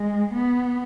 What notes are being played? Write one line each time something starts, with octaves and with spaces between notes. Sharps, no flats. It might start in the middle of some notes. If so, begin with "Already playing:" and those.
Already playing: G#3
B3